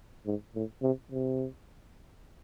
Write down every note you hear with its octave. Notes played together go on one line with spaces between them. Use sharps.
G#2
A2
C3
C3